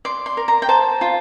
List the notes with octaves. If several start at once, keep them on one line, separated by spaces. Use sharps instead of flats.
D5 C6
C6
A#4
A#5
G5
C5 A5
F4